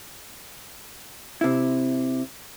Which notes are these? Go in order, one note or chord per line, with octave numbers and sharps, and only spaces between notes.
C3 E4